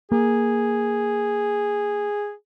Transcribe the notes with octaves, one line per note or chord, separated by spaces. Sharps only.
A#3 G#4